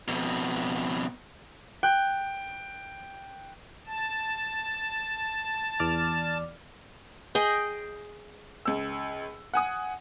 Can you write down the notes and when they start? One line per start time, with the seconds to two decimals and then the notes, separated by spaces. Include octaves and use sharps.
0.08 F2 B2
1.83 G5 F#6
3.87 A5
5.80 E2 D5 F6
7.35 G#4 D#5 G5
8.65 C#2 E6
9.54 F#5 G#5 D#6